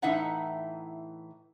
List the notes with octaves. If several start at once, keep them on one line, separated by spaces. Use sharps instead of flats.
A2 E3 D#4 E5 F#5 A#5